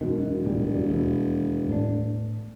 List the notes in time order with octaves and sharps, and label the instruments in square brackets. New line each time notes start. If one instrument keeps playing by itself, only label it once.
[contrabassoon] E1 [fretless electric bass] F#2 B2 D#3
[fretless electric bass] D1 A#2 G3
F#2 G3
D#2 B2
A2 C4 D4